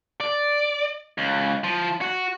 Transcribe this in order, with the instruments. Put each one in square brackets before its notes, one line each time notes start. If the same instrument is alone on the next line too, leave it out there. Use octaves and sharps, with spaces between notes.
[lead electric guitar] D5
C#2
F3
F#4